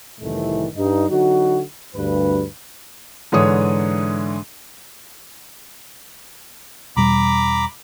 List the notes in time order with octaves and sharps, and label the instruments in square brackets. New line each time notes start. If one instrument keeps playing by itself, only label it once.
[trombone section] C2 F2 A2 D#3 E3 A3
G2 D#4
D3 F#3 D#4 F#4
D2 G2 B4
[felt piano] G#2 D3 E3 D4 C#5 D#6
[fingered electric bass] E2 B2 G3 [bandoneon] A#5 B5 D6